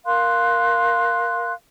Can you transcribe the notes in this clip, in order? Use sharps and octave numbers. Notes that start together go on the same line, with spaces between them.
A#4 F5 C6 F#6